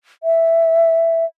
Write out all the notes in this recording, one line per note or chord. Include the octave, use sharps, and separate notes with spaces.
E5